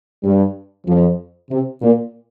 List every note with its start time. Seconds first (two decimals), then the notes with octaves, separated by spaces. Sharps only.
0.24 G2 G3
0.86 F2 F3
1.50 C3
1.81 A#2